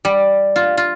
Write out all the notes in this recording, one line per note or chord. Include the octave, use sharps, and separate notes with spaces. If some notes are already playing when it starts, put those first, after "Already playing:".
G3
F4
F4